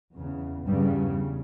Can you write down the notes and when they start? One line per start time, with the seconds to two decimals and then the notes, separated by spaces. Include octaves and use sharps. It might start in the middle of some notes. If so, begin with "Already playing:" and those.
0.15 E2 C#3
0.66 E2 G2 C#3 G3